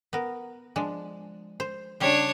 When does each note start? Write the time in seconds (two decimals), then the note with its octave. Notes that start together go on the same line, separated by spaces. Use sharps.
0.13 B3 A#4
0.76 F3 G#3 D4
1.60 C5
2.00 C#3 G3 D4 G4 C#5